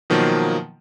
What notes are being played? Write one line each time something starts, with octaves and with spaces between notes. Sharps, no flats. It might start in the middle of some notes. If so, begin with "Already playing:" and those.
B2 D#3 F3 F#3 A#3